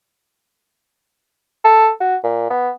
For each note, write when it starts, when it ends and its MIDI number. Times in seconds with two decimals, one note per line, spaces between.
1.65 1.90 69
2.00 2.16 66
2.24 2.48 46
2.50 2.70 59